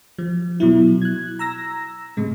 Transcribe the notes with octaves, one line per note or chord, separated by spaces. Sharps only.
F3
B2 F#3 E4
F#6 G#6
A#5 E6 A#6
A2 C3 G#3